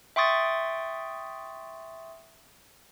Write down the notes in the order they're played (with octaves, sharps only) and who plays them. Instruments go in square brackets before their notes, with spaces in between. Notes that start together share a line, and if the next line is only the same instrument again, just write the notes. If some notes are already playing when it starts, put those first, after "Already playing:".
[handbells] E5 G5 C6 C#6 D#6 A6